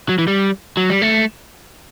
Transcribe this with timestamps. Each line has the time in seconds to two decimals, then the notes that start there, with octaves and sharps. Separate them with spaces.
0.09 F#3
0.18 E3
0.27 G3
0.77 F#3
0.90 G3
1.02 A3